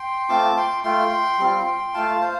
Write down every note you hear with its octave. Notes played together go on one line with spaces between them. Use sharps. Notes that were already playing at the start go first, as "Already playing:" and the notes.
Already playing: G5 C6
A3 C4 F4 A5 D6
G5 C6
A3 F4 G5 C6
G3 C4 F4
A3 F4 F5 A5
C5 F5